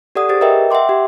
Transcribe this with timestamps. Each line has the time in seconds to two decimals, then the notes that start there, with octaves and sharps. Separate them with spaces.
0.15 G4 A4 D5 F#5 D#6
0.29 G4 G#4 C5 A6
0.41 A#4 B4 D#5 E5 G5
0.71 E5 F#5 G5 C6 D6
0.89 G4